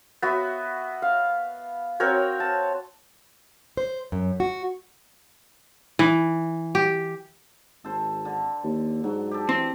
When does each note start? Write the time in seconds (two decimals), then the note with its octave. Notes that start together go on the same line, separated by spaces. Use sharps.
0.22 B3 F#4 E5
1.02 F5
2.00 C4 F#4 A#4 C#5
2.40 A5
3.77 C5
4.12 F#2
4.40 F#4
5.99 E3
6.75 G4
7.85 G#1 A4 C5
8.25 D3
8.64 D#2
9.04 G#2 F#3
9.31 G4 A4
9.49 E3 C4